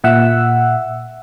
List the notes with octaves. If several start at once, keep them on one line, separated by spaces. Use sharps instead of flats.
A#2 E5 F#5 E6